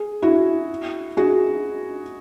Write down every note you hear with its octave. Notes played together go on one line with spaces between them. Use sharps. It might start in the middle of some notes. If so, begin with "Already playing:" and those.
Already playing: G#4
E4 F#4
F#4 G#4